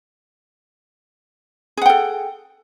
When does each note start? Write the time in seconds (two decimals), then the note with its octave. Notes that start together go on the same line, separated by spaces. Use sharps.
1.77 G#4
1.82 F#5
1.86 G5
1.90 A4